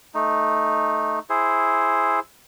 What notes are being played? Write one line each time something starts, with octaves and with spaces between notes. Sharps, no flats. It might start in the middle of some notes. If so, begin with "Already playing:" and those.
A3 D#4
E4 G#4 C5